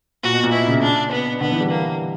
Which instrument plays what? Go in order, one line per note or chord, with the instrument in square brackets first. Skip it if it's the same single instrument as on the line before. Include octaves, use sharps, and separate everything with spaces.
[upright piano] A#2 [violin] F#4
[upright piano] B2
A#2
[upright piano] B2 [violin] E4
[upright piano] C#3
[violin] D4
B3
[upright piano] D3 [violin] B3
[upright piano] E3
G3
[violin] A#3